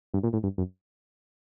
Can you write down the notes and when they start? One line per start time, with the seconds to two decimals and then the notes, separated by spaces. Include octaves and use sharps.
0.14 G2
0.23 A#2
0.33 A2
0.43 G2
0.58 F#2